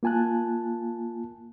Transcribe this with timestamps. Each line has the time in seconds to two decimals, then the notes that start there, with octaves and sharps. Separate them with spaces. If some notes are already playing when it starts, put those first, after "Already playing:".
0.03 A#3 F4 G#5 A5 F#6